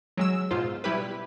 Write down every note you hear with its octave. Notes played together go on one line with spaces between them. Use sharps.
F#3 G#3 E6
G#2 B2 F4 C5
B2 G3 E4 G4 B4